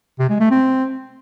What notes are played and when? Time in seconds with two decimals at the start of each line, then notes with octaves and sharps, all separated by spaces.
0.19 C3
0.30 G#3
0.40 A3
0.51 C4